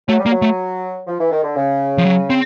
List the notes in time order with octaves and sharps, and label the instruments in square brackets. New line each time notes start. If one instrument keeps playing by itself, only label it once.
[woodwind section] F#3 [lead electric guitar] A3
[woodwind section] G3
[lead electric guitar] A#3
[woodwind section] F#3
[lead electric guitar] A3
[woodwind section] F3
E3
D#3
D3
C#3
[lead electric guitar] F3
F#3
C4